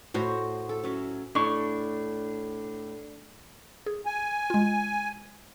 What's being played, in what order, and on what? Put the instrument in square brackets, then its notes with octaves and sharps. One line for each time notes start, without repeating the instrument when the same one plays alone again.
[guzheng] A2 [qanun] F#4 C5 C#5
[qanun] A4
F#3 C#4 E5
[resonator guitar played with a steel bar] A2 [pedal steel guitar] D4 C#6
[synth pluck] G#4
[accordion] G#5
[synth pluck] G#3 F4